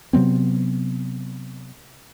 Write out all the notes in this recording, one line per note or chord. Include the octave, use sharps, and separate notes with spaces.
C3 F#3 B3 C4